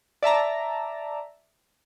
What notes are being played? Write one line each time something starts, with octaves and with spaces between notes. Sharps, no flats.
D5 E5 A5 A#5